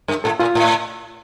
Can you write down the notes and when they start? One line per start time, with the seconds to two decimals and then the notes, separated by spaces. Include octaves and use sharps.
0.08 G2 A#4
0.24 A2 A4
0.40 A#2 F4
0.55 A2